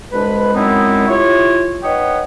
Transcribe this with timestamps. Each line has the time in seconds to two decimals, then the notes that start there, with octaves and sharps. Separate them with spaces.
0.12 C2 G#3 D4 B4
0.54 F#2 G#3 B3 C4 D#4 E4
1.08 E4 F4 G4 C#5
1.83 D#4 B4 C#5 F#5 G5 D#6